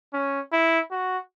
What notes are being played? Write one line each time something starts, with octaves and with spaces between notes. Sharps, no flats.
C#4
E4
F#4